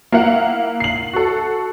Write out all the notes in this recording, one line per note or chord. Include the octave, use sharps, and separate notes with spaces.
A#3 E4 A#4 F5 F#5
C7 F#7
F#4 A4